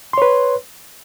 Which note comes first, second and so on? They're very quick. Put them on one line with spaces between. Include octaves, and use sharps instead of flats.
C6 C#5 B4